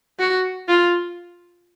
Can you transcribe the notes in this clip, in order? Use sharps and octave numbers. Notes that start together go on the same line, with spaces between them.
F#4
F4